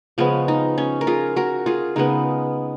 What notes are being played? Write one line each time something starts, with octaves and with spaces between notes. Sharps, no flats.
C#3 F3 G#3 B3 C#4
D#4
C#4
A#4
F4 G#4
F#4 A#4
F4 G#4
C#3 G#3 B3 D#4